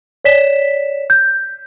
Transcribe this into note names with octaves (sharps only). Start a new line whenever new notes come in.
C#5 D5 B6 E7
G6